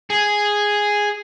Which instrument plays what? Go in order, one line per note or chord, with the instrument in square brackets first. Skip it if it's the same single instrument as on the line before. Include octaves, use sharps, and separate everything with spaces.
[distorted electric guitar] G#4